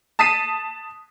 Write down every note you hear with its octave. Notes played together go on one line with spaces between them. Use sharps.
A5 D#6 B6 C7 D#7